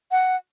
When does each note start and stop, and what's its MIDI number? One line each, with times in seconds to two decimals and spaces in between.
0.11 0.36 78